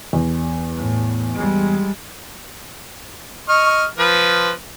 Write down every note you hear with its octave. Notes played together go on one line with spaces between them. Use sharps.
E2
A2
G3 G#3
D#5 C#6 F6
F3 B4